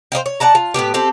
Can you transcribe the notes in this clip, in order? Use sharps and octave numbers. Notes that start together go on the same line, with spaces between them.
C5 D#5 F5 G5
C#5
D5 F#5 A5 A#5
F4
A2 C#3 B3 G4
C4 G4 A4